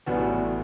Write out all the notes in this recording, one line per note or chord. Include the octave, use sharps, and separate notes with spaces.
A1 A2 G3 B3 F#4